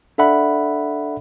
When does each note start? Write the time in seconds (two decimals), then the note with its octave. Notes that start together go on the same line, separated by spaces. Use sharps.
0.18 D4 A4 D5 E5 F#5 B5